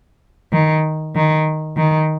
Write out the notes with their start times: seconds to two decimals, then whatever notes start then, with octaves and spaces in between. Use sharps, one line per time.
0.52 D#3
1.15 D#3
1.77 D#3